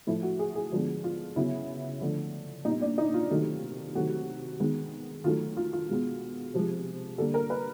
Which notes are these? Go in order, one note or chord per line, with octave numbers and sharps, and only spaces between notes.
A2 F3 A3 E4
F#4
G#4
G#4
D3 F3 G#3 B3
F4
C#3 F#3 B3 E4
D3 F3 A3
A#2 G3 B3 D#4
D4
D#4
F4
C3 D#3 F#3 A3
C3 D#3 F#3 A3 F#4
D#3 G#3 B3
D#3 F#3 A3 F4
F4
F4
B2 G#3 B3
C3 F3 G#3
D3 G3 A#3 A4
A#4
B4